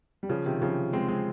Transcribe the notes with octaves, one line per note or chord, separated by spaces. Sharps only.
G3
C#3 F3
C3 D#3
C#3 F3
G#3 C4
G#3 C4